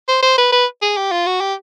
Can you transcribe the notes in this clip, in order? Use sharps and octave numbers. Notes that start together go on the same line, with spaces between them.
C5
C5
B4
B4
G#4
G4
F4
F#4
G4